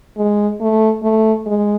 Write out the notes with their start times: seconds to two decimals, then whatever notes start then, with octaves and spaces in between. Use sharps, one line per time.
0.18 G#3
0.61 A3
1.03 A3
1.47 G#3